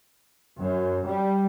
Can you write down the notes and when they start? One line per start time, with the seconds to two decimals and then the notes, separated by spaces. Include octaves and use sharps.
0.58 F#2
1.06 G3